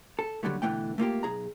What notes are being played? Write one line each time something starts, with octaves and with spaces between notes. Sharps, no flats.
A4
D#2 D3 F#3 G3 A3
B2 D3 E3 A3 G5
A3 A#3 F4 G4
B1 G#4 A#5